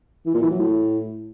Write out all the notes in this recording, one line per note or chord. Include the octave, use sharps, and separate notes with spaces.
E3
A#2
E3
F#3
A2